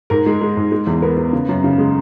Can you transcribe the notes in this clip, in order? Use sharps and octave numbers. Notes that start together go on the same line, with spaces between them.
G#2 A#4
G#3
G#3
G#2
G#3
E2
B3 A#4
B3
C#3
F#2
C#3
G#3